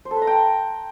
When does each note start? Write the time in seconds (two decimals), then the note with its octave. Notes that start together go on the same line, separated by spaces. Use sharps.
0.05 C5
0.11 A4
0.16 B4
0.22 A#5
0.27 G5